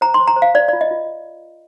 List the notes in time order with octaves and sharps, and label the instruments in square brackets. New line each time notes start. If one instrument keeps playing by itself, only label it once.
[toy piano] C5 A#5
C6
C5
A#5
C5
F5
C5 D5
D5
F4
D#5
F4